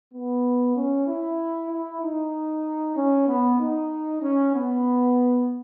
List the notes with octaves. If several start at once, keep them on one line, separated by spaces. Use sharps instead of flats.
B3
C#4
E4
E4
D#4
C#4
B3
D#4
C#4
B3